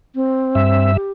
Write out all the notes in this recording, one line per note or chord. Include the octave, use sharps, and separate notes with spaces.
C4
G2 E5
G4